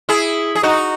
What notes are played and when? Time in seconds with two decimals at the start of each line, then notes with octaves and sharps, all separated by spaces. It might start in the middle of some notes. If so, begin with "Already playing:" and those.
0.09 E4 G#4
0.55 G#4
0.63 D#4 F#4